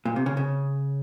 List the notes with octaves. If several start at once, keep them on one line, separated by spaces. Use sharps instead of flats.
A#2
C3
C#3
C#3